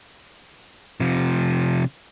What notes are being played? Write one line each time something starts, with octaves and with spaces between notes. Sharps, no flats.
C3 F3